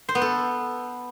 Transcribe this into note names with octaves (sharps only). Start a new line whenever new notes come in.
C5
B3
A4